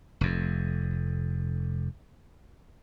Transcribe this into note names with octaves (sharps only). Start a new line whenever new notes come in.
F1 F2